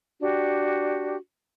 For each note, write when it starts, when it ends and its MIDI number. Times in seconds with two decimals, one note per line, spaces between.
0.21 1.16 62
0.21 1.16 66
0.21 1.16 67